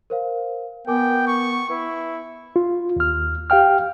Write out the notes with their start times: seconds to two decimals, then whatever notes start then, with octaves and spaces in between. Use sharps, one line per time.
0.10 A#4 C5 F5
0.87 B3 A#4 G5 G#5 D6
1.27 C#6
1.70 E4 B4
2.56 F4
2.96 D#2 F6
3.50 G4 F5 G5 F6